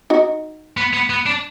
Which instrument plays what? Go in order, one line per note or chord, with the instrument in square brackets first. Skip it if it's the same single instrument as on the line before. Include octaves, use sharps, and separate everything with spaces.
[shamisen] D#4 F#4
[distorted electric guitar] B3
B3
B3
D4